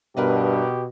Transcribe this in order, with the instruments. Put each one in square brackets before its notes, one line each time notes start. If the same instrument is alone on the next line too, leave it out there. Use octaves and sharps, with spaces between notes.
[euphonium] G2 [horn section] B2 [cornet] G4 [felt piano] A#4 B4 D#5